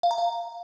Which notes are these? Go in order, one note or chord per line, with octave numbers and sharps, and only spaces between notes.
F5
A#5
F5